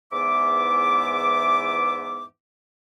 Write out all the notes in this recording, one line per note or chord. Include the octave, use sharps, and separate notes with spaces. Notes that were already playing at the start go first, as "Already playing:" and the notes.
E2 G#2 E3 B3 E5 D6